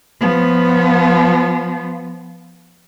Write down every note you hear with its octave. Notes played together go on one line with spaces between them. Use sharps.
F3 B3